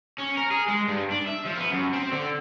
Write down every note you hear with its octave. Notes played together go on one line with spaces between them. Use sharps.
C#4
A#4
G#4
G#3
G2
D4
E5
F3
B3
F#2
C4
D3